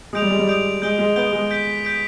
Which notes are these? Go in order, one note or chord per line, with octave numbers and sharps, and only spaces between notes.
G#3 D#6 G6 D7 F7
G3
G#3
G3
D#6 G6 D7 F7
G#3 G6 D7 G7
G#3
B3 G6 D7 G7
G#3
G6 B6 D7
G6 B6 D7